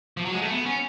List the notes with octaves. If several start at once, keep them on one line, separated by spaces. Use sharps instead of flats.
F3
F#3
G#3
A3
B3
C#4